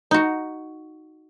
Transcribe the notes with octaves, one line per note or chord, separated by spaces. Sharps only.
D#4 F#4